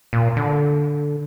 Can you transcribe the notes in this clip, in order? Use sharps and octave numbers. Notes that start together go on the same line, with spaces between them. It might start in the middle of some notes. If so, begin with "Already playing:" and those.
A#2
D3